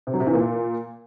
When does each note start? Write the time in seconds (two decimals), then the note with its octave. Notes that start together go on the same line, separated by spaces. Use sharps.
0.07 C3
0.14 F#3
0.20 C3
0.27 E3
0.33 A#2